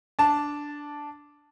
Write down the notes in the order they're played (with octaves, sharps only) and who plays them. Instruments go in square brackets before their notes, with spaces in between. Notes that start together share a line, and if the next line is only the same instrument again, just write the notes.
[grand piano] D4 A5